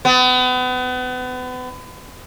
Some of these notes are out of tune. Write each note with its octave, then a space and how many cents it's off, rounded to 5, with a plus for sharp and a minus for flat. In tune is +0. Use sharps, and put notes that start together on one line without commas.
B3 +35